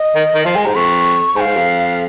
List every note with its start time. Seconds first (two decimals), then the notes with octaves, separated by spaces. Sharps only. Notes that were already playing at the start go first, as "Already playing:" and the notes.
Already playing: D#5
0.15 D#3
0.34 D#3
0.45 F3 F5
0.55 G#3 G#5
0.65 G#2 A#5
0.75 F2 C#6
1.36 G#2 G#5
1.41 F5
1.46 G#2
1.56 F2